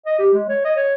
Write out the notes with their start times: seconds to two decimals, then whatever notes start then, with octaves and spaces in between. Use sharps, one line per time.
0.06 D#5
0.19 G4
0.33 G#3
0.49 C#5
0.64 D#5
0.76 C#5